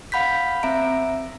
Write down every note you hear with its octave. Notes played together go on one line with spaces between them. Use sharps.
F5 F#5 B5 G6 B6
C4 E5 A#5 D7